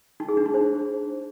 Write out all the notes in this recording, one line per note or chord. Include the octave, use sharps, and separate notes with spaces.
D#4
G#4
D4
D#4
C5